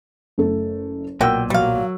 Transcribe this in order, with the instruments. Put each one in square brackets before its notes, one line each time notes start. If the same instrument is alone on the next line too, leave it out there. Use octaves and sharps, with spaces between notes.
[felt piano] F#1 A3 A4
[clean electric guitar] B1 A#2 [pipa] F#4 G5 [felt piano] A#4 E6
[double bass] F#3 [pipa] G3 F5